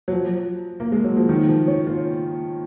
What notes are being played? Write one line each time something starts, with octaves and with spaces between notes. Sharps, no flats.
F#3
F3
A#3
G#3
F#3
F3
D#3
F3
C#4
F4